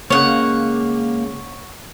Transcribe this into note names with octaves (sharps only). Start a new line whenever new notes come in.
C#2 C#3 A#3 C#5 F#5